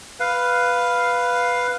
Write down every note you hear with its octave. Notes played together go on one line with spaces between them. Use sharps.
B4 F5